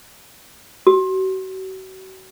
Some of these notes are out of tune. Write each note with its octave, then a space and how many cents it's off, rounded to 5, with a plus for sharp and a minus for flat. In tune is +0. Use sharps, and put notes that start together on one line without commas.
F#4 +35